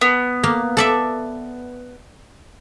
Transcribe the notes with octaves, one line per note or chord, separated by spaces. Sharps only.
B3
A#3
A4 D5 E5